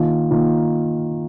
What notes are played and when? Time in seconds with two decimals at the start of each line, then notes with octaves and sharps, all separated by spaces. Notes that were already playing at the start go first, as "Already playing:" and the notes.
Already playing: D#3 A#3 F4
0.31 D#3 A#3 F4